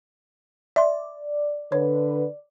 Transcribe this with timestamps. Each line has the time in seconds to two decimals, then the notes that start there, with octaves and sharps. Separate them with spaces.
0.76 D5 E5 C6
1.72 D3 B4 C#5